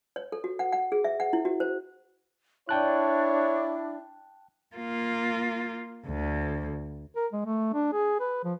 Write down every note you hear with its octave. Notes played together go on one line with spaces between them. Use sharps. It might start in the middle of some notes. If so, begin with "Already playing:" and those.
C#5
A4
F#4
F#5
F#5
G#4
E5
F#5
E4
F#4
C5
D4 E4 C#5 G5 A5 F#6
A#3 F4
D2
A#4
G#3
A3
D4
G#4
B4
F3